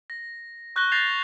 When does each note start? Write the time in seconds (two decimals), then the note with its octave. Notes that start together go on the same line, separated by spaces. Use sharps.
0.10 A#6
0.76 C#6 F#6 G6 A#6 G7
0.92 G6 A6 A#6 C7 F7